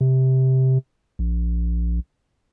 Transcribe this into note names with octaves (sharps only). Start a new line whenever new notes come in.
C3
A#1